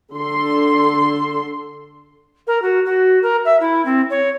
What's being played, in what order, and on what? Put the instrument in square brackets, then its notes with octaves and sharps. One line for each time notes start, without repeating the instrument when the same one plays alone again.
[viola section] D3 A4 C6
[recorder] A#4
F#4
F#4
A#4
E5
E4
C4
C#5